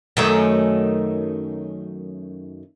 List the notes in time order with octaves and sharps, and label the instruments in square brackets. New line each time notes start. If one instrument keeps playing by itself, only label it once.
[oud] F#2 D#3 A3